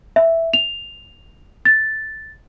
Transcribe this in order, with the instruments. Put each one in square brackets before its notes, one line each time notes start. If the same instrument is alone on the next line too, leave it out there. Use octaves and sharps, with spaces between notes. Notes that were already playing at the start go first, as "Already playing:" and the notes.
[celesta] E5
F7
A6